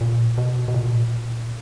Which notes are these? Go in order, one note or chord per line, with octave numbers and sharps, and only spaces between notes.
A#2
B2
B2
A#2